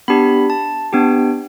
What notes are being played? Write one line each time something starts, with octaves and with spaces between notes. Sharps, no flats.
B3 D4 G4 B5
A5
B3 D4 G4 G5